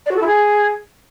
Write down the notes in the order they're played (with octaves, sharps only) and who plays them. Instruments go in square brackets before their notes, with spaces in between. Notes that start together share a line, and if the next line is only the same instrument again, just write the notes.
[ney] D5
F#4
A4
E4
G#4